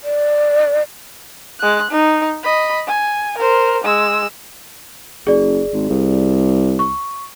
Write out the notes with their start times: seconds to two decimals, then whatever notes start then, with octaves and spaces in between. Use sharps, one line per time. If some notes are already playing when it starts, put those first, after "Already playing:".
0.04 D5
1.60 G#3 F#6
1.91 D#4
2.43 D#5 B5
2.87 G#5
3.38 A#4 C5
3.84 G#3 E6
5.27 F#1 G#4 D5
5.73 G#1
5.90 C2
6.79 C#6